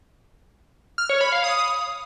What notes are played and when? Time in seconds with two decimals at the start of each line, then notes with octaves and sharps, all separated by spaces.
0.98 F6
1.09 C#5
1.21 B5
1.32 F5
1.44 D#6